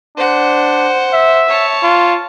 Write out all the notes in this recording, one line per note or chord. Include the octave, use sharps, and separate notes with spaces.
D4 C5 F#5
E5
C#5 A5
F4